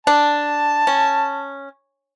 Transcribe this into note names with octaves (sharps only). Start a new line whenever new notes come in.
D4 A5
C#4